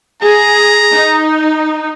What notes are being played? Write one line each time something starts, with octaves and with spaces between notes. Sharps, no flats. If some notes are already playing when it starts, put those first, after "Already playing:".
G#4 A#5
D#4